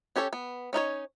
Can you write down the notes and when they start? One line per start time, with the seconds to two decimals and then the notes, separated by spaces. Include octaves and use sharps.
0.16 C#4 G4 A4 C#5
0.33 B3
0.73 C#4 D#4 F4 C#5